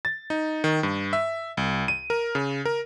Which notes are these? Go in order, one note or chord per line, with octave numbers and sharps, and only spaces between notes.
A6
D#4
D#3
G2
E5
C2
D#7
A#4
C#3
A#4